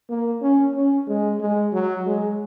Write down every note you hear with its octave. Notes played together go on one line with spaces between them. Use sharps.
A#3
C#4
C#4
G#3
G#3
F#3
G#3